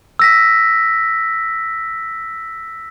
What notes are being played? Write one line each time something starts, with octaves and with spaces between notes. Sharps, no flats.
E6 A#6 B6